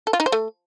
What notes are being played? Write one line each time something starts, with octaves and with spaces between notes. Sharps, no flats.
A4
F4
D#4
C5
A3